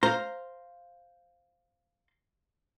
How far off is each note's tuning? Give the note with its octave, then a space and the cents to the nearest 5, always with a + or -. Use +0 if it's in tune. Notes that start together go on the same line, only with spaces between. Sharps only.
C5 +0 F5 +0 A#5 +0